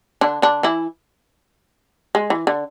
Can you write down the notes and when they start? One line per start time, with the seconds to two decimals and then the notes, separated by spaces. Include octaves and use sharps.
0.21 D3 D4
0.42 D3 D4
0.63 E3 E4
2.15 G#3
2.30 E3
2.47 D3